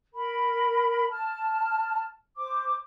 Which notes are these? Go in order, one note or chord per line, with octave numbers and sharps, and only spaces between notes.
A#4 B5
A5 F6
C5 D6